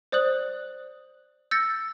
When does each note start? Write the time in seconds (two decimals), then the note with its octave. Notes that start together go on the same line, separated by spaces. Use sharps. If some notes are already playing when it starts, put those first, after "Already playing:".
0.12 C5 D5 D#6 F#6 F#7
1.51 E6 G6 A6 A#6 C#7